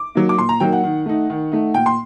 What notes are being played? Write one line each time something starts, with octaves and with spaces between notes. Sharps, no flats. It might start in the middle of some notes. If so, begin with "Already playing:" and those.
Already playing: D6
F#3 A#3 D#4
D6
A#2 C6
A#5
F#3 A#3 D#4 G5
F#5
D#3
A3 D#4
D#3
A3 D#4
A#2 G5
C6